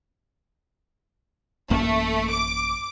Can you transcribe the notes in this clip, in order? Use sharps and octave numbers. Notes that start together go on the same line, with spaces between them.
A1 F#2 A3 A#3
D6